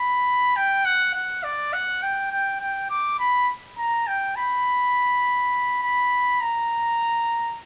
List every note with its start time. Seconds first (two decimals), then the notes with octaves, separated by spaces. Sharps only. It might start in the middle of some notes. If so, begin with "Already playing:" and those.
Already playing: B5
0.56 G5
0.85 F#5
1.15 F#5
1.44 D5
1.73 F#5
2.03 G5
2.32 G5
2.61 G5
2.90 D6
3.19 B5
3.78 A#5
4.07 G5
4.36 B5
5.83 B5
6.41 A#5